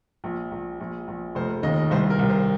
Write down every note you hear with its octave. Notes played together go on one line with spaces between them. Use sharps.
A#1
A#1
A#1
A#1
F1 C5
D#2 D#5
C2 C5
A#4
C2
C5